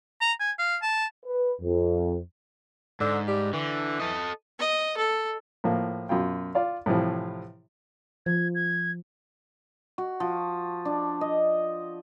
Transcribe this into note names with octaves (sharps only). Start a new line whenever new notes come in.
A#5
G#5
F5
A5
B4
F2
G#2 D3
G3
D3 E3
A4 D#5
D#5
A4
A2 F3 A#3
F#2 B2 F4 G5
F4 D5 F5
A2 C3 E3 F3 G3
F3 G#6
G#6
F#4
F3
D4
D#5